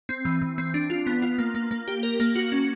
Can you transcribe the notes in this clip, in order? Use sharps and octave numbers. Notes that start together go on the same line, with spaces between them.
C4
E3
E3
C4
D4
F4
B3
F4
A#3
A#3
A#3
G4
A#4
A#3
F#4
C#4